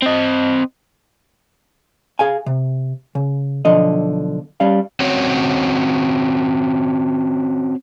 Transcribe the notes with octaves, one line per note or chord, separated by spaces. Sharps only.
C4 D#5
G#4 F5 G#5
C3
C#3
B1 D3 F3 D#5
G3 C#4 F5
C4 C#4 F#4 C#5